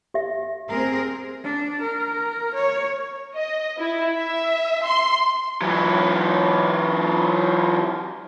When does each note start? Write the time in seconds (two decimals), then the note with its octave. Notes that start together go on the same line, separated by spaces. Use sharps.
0.14 G4 E5
0.69 C4 G#4 A#4
1.44 D4
1.81 A#4
2.54 C#5
3.36 D#5
3.79 E4
4.13 E5
4.86 C6
5.62 E3 F#3